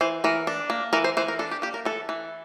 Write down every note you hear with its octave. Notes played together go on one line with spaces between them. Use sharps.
E3 C5
E3 A#4
D4
A#3
E3 A#4
C5
E3 C5
A#4
D4 A4
G4
A#3 G4
A#4
E3 A4
E3